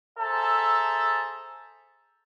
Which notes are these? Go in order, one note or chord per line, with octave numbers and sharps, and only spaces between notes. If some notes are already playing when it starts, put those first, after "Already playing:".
G#4 A4 C5 E5 A5 A#5